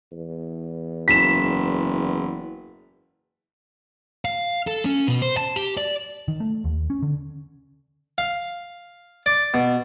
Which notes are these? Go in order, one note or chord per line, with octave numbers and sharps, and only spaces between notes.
E2
F#1 B6 E7
F5
A4
C#4
B2
C5
A5
G4
D5
D#3
A3
D#2
C#4
D3
F5
D5
B2